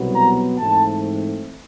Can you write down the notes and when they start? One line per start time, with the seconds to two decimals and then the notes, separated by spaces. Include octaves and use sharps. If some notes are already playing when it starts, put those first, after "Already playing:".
Already playing: C2 B2 F#3 B3
0.13 A#5
0.58 G#2 E3 A3 C4 A5